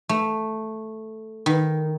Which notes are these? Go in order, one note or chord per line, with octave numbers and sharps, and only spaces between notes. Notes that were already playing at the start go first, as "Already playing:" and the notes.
A3
D#3